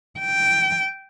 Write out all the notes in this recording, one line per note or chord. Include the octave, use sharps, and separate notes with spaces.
G5